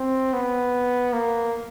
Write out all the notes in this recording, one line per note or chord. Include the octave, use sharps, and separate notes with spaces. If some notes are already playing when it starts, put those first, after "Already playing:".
Already playing: C4
B3
A#3